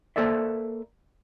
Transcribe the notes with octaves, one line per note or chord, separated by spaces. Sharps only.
A#3 A4 C5 D5 E5